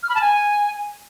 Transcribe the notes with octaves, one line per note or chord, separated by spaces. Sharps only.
F6
B5
A5
G#5